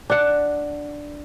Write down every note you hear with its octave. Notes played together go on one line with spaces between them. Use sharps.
D4 F#5